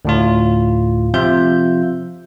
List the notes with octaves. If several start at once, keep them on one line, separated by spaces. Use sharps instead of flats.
D2 A2 F4
C3 F3 F4 E5 G6